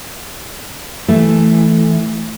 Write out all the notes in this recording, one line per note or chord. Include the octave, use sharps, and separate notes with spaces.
E3 A3